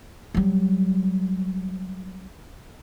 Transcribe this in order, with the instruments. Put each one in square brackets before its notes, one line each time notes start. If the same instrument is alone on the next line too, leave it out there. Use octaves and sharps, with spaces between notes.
[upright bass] F#3 G3